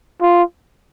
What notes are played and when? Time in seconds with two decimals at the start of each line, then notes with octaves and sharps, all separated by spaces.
0.22 F4